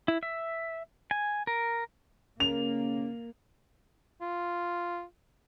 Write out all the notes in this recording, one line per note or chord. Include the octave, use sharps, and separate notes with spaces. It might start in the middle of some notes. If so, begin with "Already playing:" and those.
E4
E5
G#5
A#4
C#3 A#3 F7
F4